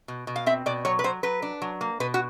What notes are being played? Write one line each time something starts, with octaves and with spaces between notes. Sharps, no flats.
B2
B2
F5
C4 E5
B2 D5
F#3 C#5
B4
F#3 C5
F#3 B4
D4
F#3
A#3
B2 B4
F#4